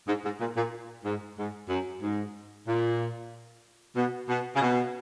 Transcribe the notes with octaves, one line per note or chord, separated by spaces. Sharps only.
G#2
G#2
A#2
A#2
G#2
G#2
F#2
G#2
A#2
B2
B2
C#3
B2